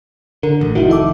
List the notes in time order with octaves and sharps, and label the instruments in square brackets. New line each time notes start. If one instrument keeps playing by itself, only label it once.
[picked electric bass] D3 [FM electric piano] A#4
[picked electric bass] A1
[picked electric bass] F1 C2 D#3 [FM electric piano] E4 F#4
[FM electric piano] A4 E5 D6